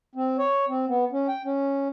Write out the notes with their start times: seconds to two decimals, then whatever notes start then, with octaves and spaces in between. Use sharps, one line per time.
0.15 C4
0.39 C#5
0.68 C4
0.88 B3
1.12 C#4
1.28 G5
1.45 C#4